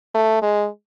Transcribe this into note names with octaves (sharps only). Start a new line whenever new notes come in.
A3
G#3